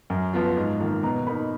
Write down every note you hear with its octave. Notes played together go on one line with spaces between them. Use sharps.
F#2
F3 B3 F4
G#2
D#3 A#3 F4
B2 A#5
A#3 D#4 B5